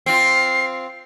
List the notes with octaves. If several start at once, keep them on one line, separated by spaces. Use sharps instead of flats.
C4 F4 C7